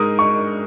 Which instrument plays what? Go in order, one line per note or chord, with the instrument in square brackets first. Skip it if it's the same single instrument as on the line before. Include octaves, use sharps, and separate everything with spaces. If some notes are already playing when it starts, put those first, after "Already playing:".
Already playing: [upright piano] G#2 G#3 D#4 A#4 [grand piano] D#6
[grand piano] C#6